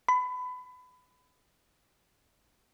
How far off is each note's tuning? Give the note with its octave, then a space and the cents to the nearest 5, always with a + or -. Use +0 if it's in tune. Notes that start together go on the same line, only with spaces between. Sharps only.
B5 +25